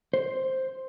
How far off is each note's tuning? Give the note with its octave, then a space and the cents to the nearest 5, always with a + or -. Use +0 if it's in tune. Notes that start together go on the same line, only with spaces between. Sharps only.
C5 +5